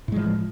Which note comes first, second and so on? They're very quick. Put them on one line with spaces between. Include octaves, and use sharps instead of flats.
A2 G#3 F3